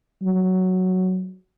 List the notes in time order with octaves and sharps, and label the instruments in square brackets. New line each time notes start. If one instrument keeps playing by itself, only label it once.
[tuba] F#3